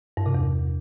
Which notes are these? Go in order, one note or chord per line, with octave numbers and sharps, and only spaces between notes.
G2
C3
E2